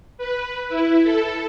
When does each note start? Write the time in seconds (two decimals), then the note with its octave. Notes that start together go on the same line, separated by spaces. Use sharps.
0.18 B4
0.69 E4
1.03 A4